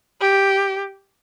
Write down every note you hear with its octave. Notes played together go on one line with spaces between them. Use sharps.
G4